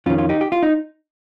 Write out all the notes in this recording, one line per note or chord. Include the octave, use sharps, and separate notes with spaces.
F2 D#3 C#4 F4
C#4 F4
D#4 G4
G4
F4
D#4